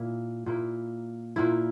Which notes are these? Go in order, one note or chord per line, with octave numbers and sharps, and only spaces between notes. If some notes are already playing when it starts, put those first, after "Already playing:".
Already playing: A#2 A#3 E4
A#2 A#3 E4
A#2 A#3 E4